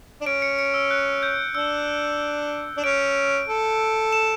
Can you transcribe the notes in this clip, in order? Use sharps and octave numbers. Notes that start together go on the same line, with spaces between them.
D4
C#4 D7
C#7
C#7
E6
F#6
G6
D4 E6
D4
C#4 D7
A4
E7